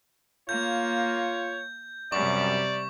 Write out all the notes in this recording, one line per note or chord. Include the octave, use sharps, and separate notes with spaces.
A#3 F4 C#5 G6
F#2 C3 G3 D5 C#6